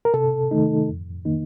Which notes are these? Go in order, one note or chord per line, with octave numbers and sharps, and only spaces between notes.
A#4
C3 A4
D#3 A3 D#4
F2
D#3 A#3 D#4